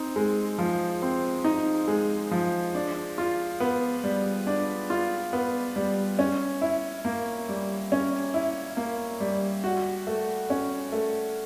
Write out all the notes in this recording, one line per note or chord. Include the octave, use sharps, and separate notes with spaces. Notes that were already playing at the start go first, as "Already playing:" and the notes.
Already playing: C4 D#4
G#3
F3
C4
D#4
G#3
F3
D4
F4
B3
G3
D4
F4
B3
G3
C#4
E4
A#3
G3
C#4
E4
A#3
G3
F#4
A3
C#4
A3